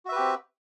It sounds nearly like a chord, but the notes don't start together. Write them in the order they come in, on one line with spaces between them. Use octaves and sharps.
F#4 E5 B4 G4 C4